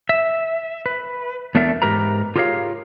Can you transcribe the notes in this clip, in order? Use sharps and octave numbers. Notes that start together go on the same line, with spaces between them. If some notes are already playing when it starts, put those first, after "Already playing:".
E5
B4
E2 A3 B3 D4 A#4 E5
G#2 G4 A#4 B4 A#5
F4 G4 G#4 A#4 C#5 F5